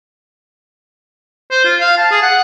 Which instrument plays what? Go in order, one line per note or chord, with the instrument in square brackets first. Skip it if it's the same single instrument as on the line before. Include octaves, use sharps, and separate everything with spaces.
[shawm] C5
F4
F5
A5
G#4
F#5